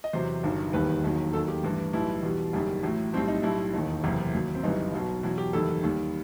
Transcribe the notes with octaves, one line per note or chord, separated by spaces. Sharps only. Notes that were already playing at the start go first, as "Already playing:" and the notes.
D#5
E2 C3 F#3 C5
G1 G2 D#3 F#3
E1 D#2 D#3 G3 B4
E1 D#2 D#3 F#3
D#2 D#3 F#3 A4
G4
A1 G2 E3
B1 A2 E3 G3 E4
E2 B2 G3
F#1 F#2 D#3 G3
A1 A2 F#3
B1 A2 G3 C4
D#4
B1 A2 G3 E4
E1 D#2 D#3 D#4
F#1 E2 C3
D#2 D#3 F#3
C4
G1 F#2 E3 G3 D#4
B1 B2 F#3
E2 B2 F#3 E4
G4
F#1 E2 D#3 G3 A4
D#2 D#3 G3